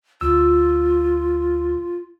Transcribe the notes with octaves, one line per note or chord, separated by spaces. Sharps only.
D2 F4 E6